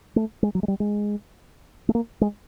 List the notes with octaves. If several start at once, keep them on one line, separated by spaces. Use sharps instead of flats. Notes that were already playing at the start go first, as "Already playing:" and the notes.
A3
G#3
F#3
G#3
G3
G#3
A3
A#3
G#3